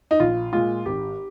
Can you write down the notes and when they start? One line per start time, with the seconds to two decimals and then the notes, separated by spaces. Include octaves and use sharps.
0.11 D#4
0.20 A#1 F4
0.53 A#2 G#3 F4
0.86 G#1 G4